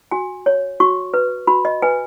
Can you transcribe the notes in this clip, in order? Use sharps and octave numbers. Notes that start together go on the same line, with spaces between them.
F#4 G#5
C#5
F#4 C#6
B4
F#4 B5
D#5
B4 G#5